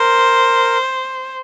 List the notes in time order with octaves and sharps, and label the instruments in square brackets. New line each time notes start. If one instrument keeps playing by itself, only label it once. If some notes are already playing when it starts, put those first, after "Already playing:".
Already playing: [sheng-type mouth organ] A#4 [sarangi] C5